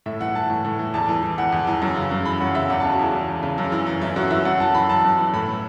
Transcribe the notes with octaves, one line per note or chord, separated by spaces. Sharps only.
A2 E5
E3 F#5
E3 A5
A2
A2
E3
E2 A5
E3
E3
E2 F#5
E2
E3
F#2
C#3
F#2
E3 B5
F#2 F#5
C#3 E5
E2 F#5
C#3 A5
F#4
E2 E4
E3
E2
C#3
F#2
E3
E3
F#2 E4
F#2 F#4
E3 E5
F#2 F#5
E3 A5
E3 B5
F#2 A5
F#2
E3
A2 B5
E3